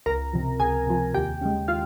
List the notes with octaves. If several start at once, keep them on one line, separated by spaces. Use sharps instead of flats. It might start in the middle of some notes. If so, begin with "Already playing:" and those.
C#2 A#4 A#5
C3 F3
C#2 G#4 G#5
C3 F3
D#2 G4 G5
C#3 G#3
F4 F5